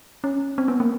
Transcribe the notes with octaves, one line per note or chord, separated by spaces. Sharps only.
C#4
C4
B3
A#3